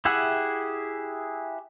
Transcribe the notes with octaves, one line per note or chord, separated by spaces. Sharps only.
E4 G4 G#4 E5 F#5